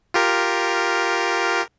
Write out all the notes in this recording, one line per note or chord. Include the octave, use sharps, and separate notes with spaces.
F4 G4 A#4